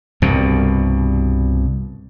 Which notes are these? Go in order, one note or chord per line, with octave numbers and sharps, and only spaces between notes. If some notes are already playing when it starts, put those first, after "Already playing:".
C2 G2 B2